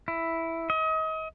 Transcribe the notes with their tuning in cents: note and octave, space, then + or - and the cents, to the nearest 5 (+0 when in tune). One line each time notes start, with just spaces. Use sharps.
E4 +0
D#5 +35